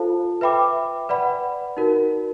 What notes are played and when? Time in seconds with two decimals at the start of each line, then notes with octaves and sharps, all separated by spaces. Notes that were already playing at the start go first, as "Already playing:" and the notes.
Already playing: F4 A4 C5 F5 A5
0.41 B4 E5 G5 B5 D6
1.09 B4 D5 F#5 B5
1.77 D#4 F#4 A#4